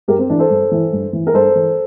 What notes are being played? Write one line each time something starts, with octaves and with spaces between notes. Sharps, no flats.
G2 G4 A#4
C4
E3 D4
A4 C5
G2
E3
G2
E3
A#4
G2 A4 C5
E3